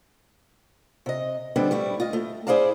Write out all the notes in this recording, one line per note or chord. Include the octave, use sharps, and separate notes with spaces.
C3 D#5
D3 G3 B3 C4 D4
G3 A3 E4
F4 D#5
A3
E4 G#4 C5 D5 F5 A5